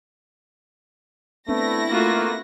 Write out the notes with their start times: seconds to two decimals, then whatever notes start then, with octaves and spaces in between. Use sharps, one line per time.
1.48 A3 B3 C4 D4 E4 A#6
1.91 A3 A#3 F4 F#4